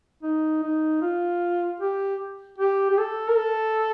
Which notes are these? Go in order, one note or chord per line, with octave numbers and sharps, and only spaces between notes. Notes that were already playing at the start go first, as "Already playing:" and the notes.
D#4
D#4
F4
G4
G4
G4
A4
A#4
A4